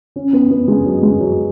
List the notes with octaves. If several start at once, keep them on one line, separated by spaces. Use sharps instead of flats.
C#4
B3
B3
G#3
F#3
G#3
F#3